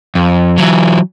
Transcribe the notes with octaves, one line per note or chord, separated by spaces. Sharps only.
F2
E3 F#3